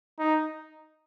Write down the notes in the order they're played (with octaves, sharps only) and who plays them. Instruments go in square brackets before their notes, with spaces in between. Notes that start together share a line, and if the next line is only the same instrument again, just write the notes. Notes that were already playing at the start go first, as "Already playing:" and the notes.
[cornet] D#4